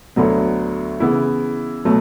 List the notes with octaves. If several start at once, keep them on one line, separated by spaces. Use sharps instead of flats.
D2 D3 F#3 B3
C#3 E3 B3 E4
B2 F#3 A3